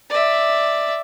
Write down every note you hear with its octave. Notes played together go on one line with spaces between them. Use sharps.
D5 E5